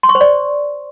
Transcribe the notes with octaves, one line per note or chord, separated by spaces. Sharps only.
C6
C#6
C5
D5